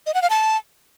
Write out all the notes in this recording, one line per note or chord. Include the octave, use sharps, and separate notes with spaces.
D#5
F#5
F5
A5